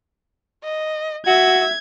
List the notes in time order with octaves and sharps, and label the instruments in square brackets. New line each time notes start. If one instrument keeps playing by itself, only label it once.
[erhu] D#5
[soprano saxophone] F#4 [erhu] E5 [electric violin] G#6